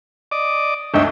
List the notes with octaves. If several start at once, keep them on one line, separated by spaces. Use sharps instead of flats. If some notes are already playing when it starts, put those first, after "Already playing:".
D5 D#5 D6
G1 D2 C#5 D#5 E5 G5